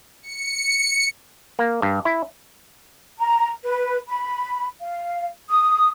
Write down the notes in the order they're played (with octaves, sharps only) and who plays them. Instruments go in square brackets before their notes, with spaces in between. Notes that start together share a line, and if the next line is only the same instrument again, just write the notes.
[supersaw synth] C#7
[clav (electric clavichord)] A#3
G2
E4
[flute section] A#5
B4
B5
F5
D#6